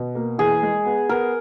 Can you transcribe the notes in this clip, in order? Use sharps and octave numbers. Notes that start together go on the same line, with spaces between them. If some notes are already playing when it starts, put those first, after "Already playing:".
Already playing: B2
A#3
E3 G#4
G#3
B3
B3 A#4